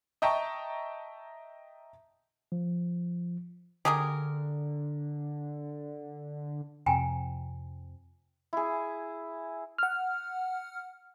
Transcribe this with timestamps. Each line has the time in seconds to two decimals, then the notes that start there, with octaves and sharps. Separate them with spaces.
0.22 D#5 E5 G5 A5 A#5 C#6
2.52 F3
3.85 D3 G4 G#4 A#4
6.86 F2 C3 G5 G#5 A#5
8.53 E4 G#4
9.78 F#5 F6